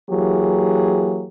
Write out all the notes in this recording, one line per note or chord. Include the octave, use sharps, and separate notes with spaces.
E3 F#3 A#3 G4 G#4